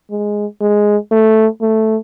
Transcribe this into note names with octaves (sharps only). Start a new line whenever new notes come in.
G#3
G#3
A3
A3